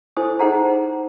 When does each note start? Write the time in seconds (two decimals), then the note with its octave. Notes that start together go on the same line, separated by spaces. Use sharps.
0.17 E4 A4 C5 G#5 D#6
0.39 D#4 G#4 C5 F#5 A5 A#5